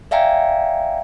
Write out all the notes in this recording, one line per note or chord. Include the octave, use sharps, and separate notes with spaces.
D5 E5 F5 G5 G#5 A#5